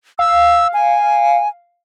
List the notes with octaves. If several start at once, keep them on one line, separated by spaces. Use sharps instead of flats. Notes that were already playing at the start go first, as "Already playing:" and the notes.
F5 E6
G#5